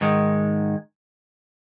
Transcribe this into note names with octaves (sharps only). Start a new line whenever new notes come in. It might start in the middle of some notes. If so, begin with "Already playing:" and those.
G#2 D#3 G#3